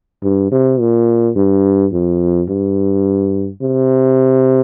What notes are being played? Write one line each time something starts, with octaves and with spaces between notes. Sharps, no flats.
G2
C3
A#2
G2
F2
G2
C3